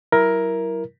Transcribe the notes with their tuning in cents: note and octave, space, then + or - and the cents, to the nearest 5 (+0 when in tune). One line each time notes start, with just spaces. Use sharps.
F#3 +30 E4 +0 A#4 +10